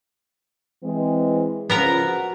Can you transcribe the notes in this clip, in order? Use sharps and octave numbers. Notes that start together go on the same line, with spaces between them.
E3 G#3 C4
C#3 F3 B3 A#4 A#5
F#4